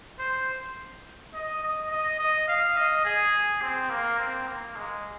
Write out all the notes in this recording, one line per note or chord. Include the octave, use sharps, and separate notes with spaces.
C5
D#5
D#5
D#5
D#5
F5
D#5
G#4
C4
A#3
C4
A#3
G#3